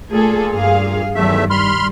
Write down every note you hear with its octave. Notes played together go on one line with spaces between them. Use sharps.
A#2 A3 G#4 A4
G2 G#4 F5
E2 G2 D#3 F#3 A3 E5
G3 B5 C6 F6